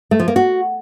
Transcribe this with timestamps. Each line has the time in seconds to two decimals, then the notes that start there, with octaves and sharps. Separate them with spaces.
0.11 A3
0.19 F3
0.28 A#3
0.36 F#4